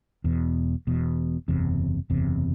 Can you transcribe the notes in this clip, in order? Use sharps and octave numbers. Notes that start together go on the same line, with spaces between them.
E1 E2 B2
E1 E2 B2
F#1 E2 C3
F#1 E2 C3